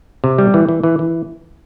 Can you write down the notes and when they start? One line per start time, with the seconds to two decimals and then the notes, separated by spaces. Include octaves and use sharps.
0.24 C3
0.38 G3
0.54 E3
0.69 E3
0.83 E3
0.99 E3